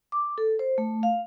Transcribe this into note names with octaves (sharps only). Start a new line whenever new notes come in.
D6
A4
C5
A3
F5